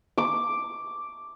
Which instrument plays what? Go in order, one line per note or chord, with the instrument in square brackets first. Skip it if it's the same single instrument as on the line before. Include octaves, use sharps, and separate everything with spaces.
[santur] D6